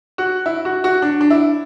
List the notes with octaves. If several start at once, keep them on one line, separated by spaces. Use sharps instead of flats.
F#4
E4
F#4
F#4
D4
D4
E4